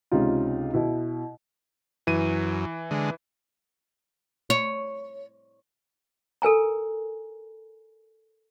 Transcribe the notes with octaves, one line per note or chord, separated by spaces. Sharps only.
C#2 C3 C#4 D#4 F4
B2 E4
F#2 E3 D#7
D3 G#3
C#5
A4 A#4 G#5 A#5